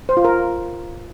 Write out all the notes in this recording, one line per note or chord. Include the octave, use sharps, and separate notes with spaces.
C5
F4
A#4